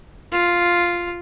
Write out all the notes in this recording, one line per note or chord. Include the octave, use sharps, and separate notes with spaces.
F4